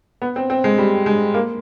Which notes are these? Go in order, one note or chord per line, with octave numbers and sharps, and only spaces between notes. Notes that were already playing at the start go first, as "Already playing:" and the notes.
B3
C4
C4
G#3
G3
G#3
A#3